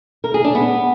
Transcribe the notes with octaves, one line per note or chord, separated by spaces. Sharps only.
A#4
G#4
D4
B3